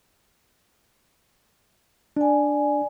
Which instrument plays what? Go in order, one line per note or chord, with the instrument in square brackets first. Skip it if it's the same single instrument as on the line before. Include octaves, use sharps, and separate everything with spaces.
[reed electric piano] D4 [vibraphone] D5 G#5